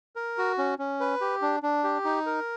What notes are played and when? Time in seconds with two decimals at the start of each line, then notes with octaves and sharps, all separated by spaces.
0.16 A#4
0.38 F#4
0.58 C#4
0.79 C#4
1.00 B4
1.21 G4
1.42 D4
1.63 D4
1.84 G4
2.05 D#4
2.26 A#4